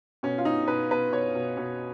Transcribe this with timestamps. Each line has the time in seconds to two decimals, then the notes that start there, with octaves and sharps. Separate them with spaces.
0.23 B2 C#4
0.38 F4
0.45 B2 D#4
0.68 B2 B4
0.91 B2 B4
1.13 B2 C#5
1.35 B2
1.57 B2